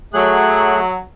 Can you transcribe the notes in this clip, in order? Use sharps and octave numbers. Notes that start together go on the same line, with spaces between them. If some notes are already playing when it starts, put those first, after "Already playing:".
F#3 A3 G#4 F#6